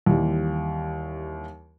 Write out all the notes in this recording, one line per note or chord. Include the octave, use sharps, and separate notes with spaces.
D#2 E3 G3